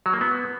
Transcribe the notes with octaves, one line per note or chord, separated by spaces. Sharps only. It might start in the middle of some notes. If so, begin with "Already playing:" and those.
F#3
A#3
B3